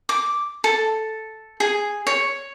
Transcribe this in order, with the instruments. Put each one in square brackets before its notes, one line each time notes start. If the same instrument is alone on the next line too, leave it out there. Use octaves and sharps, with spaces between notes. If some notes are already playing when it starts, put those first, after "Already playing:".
[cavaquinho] D6
A4
G#4
C#5